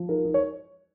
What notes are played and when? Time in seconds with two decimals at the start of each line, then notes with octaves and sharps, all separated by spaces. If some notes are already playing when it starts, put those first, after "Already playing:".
Already playing: F3
0.09 D#4 A#4
0.25 D#4
0.34 C#5